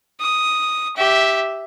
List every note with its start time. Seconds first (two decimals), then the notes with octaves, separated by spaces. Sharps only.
0.20 D#6
0.96 G4 E5